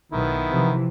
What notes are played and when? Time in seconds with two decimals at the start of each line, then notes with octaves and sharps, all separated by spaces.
0.12 B1 D#3 B3 E4
0.50 C3 E3 F3